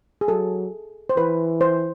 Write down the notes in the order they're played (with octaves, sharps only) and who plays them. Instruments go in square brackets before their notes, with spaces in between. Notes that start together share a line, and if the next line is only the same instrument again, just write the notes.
[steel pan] G#4
[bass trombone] F#3 [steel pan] A4
[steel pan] C5
[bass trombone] E3 [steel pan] B4
[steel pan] C5